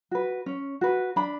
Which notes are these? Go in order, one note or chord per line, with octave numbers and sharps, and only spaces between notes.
F#4 B4
C#4
F#4 B4
D4 B5